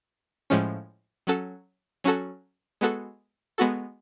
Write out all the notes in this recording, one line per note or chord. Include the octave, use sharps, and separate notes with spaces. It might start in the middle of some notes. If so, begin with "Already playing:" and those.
A2 F3 G#3 C#4
F#3 C#4 F#4 A4
F#3 C#4 F#4 A4
G#3 B3 F#4 A4
G#3 B3 F#4 A4